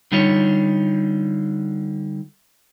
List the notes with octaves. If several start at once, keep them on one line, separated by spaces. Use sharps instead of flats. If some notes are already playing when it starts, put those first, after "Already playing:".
D3 G3 D#4 F4 C#5